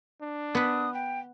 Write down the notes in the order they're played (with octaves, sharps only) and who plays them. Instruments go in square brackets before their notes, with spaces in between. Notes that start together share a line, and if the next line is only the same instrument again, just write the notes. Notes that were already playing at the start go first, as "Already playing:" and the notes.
[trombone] D4
[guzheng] B3 B4 [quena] D#6
[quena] G5